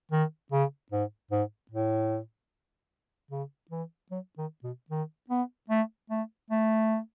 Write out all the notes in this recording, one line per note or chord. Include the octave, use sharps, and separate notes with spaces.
D#3
C#3
G#2
G#2
A2
C#3
E3
F#3
D#3
B2
D#3
B3
A3
A3
A3